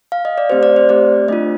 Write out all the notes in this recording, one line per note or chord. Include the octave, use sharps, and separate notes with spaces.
F5
D#5
D5
A3 C4 G4 C5
D5
C5
A3 C4 G4 D5
A3 D4 F4 D#5